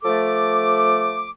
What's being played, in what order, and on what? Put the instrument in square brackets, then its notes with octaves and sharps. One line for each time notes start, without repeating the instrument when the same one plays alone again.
[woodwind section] F3 A3 A4 D6